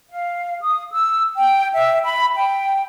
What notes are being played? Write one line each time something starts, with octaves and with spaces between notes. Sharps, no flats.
F5
D#6
E6
G5
E5
B5
G5